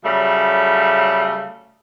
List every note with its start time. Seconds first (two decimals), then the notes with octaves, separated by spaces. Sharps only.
0.04 C#3 F#3 G3 A3